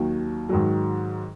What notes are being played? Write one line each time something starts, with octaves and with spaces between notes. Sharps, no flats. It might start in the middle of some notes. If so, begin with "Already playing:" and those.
Already playing: D#2 D#3 F#3
G#2 D#3 F#3